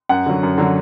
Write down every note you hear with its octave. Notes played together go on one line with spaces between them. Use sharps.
F#2 F#5
D3 F#3
F#2
D3 F#3